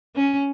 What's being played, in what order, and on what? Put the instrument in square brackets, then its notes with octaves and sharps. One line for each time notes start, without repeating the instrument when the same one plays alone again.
[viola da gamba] C#4